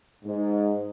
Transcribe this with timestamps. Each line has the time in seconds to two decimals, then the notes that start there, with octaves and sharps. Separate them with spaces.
0.25 G#2